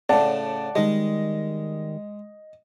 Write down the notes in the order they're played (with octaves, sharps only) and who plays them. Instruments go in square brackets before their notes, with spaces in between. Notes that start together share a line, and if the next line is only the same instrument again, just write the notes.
[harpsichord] A2 C#3 [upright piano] D5 F#5 A5
[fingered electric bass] D#3 G3 [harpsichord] G#3 [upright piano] D#5